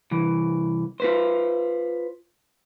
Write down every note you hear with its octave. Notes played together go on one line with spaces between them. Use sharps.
C2 E3
F4 B4 C5